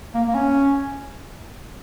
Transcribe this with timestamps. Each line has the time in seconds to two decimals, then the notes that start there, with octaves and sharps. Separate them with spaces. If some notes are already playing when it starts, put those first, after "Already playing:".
0.15 A#3
0.28 A#3
0.35 C#4